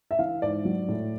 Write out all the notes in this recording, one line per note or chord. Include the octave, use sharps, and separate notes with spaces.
E5
E3 F5
G#2 D5
F#3
A2